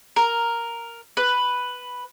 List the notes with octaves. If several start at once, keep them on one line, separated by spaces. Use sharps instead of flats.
A#4
B4